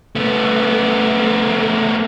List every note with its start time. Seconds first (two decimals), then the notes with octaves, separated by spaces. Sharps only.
0.15 A3 B3